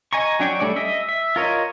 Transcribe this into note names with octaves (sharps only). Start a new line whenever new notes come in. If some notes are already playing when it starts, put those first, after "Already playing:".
D#5 G#5 A#5 C#6
F#3 D4 G5 C#6
G3 A3 C#4 D5
D#5 E5
E5
F4 A#4 C#5 D#5